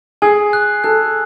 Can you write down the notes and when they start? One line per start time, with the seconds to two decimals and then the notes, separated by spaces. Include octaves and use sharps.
0.22 G#4 G#5
0.53 F#6
0.84 A4 F#6